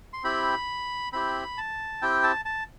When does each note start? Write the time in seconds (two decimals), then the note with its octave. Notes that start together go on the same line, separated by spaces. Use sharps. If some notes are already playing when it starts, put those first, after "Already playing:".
0.13 C6
0.23 C4 E4 G4 B5
1.13 C4 E4 G4 B5
1.58 A5
2.02 C4 E4 G4 G5
2.23 A5
2.45 A5